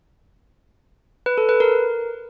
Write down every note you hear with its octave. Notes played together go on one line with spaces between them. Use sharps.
B4
A4
B4
A#4